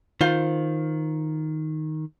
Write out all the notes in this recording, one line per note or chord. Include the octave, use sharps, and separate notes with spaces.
D#3 F4 C5